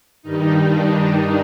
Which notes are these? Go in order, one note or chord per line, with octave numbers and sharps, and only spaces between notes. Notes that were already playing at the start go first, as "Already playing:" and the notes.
G2 D#3 G3 D#4
D4
D#4